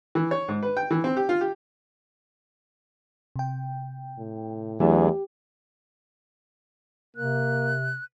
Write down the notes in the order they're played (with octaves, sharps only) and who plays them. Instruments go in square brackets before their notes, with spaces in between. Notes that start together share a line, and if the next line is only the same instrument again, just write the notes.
[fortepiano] E3
C#5
G#2
B4
G5
E3
C4
G4
F4
G4
[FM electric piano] C3 G5
[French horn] A2
[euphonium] E2 [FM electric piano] E3 A3 E4 [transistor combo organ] F#3 D4 G#4 [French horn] G4
[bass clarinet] C3 [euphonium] A#3 [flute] F#6